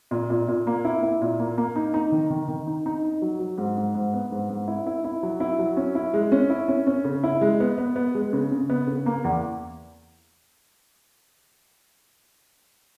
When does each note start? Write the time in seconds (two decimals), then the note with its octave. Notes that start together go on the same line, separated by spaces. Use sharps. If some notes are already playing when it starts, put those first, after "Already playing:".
0.11 A#2
0.30 A#2
0.48 A#2
0.67 A#3
0.85 E4
1.03 E4
1.21 A#2
1.40 A#3
1.58 A#3
1.76 D#4
1.94 D#4
2.12 D#3
2.30 D#3
2.48 D#3
2.67 D#4
2.86 D#4
3.04 D#4
3.22 F#3
3.39 F#3
3.58 G#2
3.77 G#2
3.95 G#2
4.13 B3
4.32 G#2
4.50 G#2
4.68 E4
4.86 E4
5.04 E4
5.23 F#3
5.40 E4
5.59 F#3
5.77 C#4
5.95 E4
6.14 G#3
6.32 C#4
6.50 E4
6.68 C#4
6.87 C#4
7.04 C#3
7.24 E4
7.41 G#3
7.60 B3
7.78 B3
7.96 B3
8.15 G#3
8.33 C#3
8.51 C#3
8.70 B3
8.87 C#3
9.06 A#3
9.24 E2